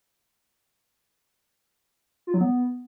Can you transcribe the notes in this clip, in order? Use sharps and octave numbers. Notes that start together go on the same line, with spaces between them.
F4
F#3
B3